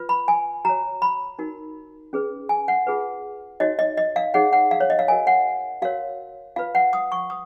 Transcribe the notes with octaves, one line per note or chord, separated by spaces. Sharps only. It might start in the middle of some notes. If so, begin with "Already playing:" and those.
Already playing: F4 B4
B5
G#5
F#4 C#5 A#5
B5
D#4 F#4 A#4
C#4 G#4 B4
G#5
F#5
F4 G#4 B4
D#4 F#4 C#5 D#5
D#5
D#5
F5
D#4 G#4 C#5 F#5
F#5
F5
C#5
D#5
F5
F#4 A#4 C#5 G#5
F#5
F#4 A#4 C#5 F5
F4 B4 F5
F#5
D#6
C#6
D#6